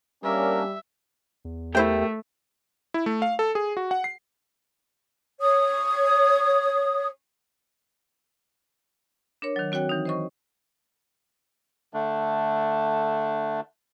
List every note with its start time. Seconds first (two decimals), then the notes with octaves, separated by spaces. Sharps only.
0.24 G3 A#3 C#4 D4 A#4 E5
1.45 E2
1.75 A3 E4 G4 A#4 C5 E5 G5
2.94 E4
3.06 A3
3.22 F5
3.39 A4
3.55 G#4
3.77 F#4
3.91 F#5
4.04 C7
5.41 C#5 D#6
9.42 D4 A#4 C#5
9.56 D#3 F#3
9.72 C4 F#4 C#5 G5 F#6
9.89 E3 D#4
10.05 C5 D#5 C#6
11.94 D3 A3 D4